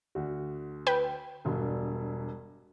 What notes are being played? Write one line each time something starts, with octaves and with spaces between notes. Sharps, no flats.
D2 F#4
B4 G5
E1 G2 B2